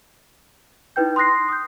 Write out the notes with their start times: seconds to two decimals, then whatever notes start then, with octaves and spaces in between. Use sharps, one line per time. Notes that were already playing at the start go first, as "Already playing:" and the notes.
0.96 D#4 E4 B4 G5 G6
1.16 C6 D#6 F#6 A#6 C7
1.48 D#6 G6